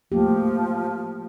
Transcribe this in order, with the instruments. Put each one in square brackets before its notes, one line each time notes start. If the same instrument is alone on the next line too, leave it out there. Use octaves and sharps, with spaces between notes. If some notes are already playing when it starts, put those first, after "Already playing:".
[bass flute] F3 [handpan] A3 A#3 G4